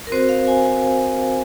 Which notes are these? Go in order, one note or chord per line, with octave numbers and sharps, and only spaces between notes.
A#4
C4 F#4 C5
F5
G#5